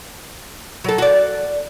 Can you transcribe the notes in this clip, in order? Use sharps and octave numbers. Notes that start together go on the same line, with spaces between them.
F#3 A4
F#4 D5